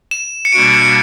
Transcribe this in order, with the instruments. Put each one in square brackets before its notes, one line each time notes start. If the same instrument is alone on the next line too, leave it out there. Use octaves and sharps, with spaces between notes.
[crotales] E7
C#7
[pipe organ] B2 G3 A#3 D4 F#4 [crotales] D7
[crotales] C#7